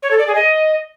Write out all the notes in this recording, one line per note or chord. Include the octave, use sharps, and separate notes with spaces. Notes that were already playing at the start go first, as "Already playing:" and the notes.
C#5
A4
D5
G#4
D#5